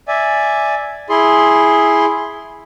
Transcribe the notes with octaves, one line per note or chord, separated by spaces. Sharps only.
D5 E5 G#5
E4 G#4 C6